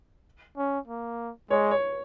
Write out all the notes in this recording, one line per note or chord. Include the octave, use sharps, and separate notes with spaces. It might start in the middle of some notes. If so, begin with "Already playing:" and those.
C#4
A#3
G#3 C#5
C#5